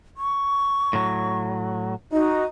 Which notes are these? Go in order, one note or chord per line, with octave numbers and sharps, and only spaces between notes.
C#6
A2 F#3
D#4 F#4